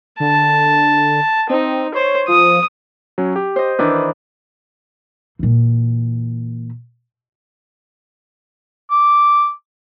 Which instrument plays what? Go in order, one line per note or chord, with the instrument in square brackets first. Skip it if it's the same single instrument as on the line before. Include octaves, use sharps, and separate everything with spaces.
[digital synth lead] D3 [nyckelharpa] A5
[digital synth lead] C4 [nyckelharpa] D#4
[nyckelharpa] C5 [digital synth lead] C#5
[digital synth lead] F3 [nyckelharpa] D#6
[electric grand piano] F#3 C#4
G4
[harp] C5 D#5
[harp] D#3 E3 D4 [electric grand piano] B4
[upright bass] A#2 E3
[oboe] D6